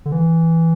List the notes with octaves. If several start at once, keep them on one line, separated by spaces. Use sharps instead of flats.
D3
E3